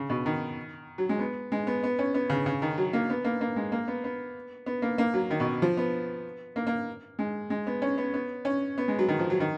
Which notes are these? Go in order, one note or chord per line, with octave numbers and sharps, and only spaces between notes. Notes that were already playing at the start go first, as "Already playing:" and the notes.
Already playing: C#3
B2
D#3
F#3
G#3
B3
G#3
B3
B3
C#4
B3
C#3
C#3
D#3
F#3
A#3
B3
A#3
A#3
G#3
A#3
B3
B3
B3
A#3
A#3
F#3
D#3
B2
F3
B3
A#3
A#3
G#3
G#3
B3
C#4
B3
B3
C#4
B3
G#3
F#3
D#3
F3
F#3
D#3